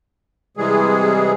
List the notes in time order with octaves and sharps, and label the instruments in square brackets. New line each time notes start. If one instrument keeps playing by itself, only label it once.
[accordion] C3 E3 G3 G#3 G#4